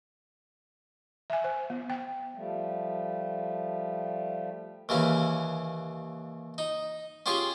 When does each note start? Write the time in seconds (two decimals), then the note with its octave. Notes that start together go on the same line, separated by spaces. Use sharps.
1.30 E5 G#5
1.44 C5
1.70 B3
1.90 G5
2.34 F3 G3 A3
4.89 D#2 C#3 E3 C#4
6.58 D#4
7.26 C#4 F4 G4 G#4 C#5